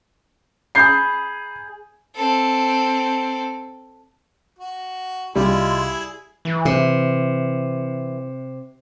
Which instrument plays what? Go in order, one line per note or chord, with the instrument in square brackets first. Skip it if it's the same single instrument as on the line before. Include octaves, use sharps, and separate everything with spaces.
[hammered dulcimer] G#4 B5 [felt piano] G6 C7
[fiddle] C4 A4
[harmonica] F#4
[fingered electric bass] C2 [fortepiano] G3 [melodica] G#3 F4 [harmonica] E4 G#4
[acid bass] E3
[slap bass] C3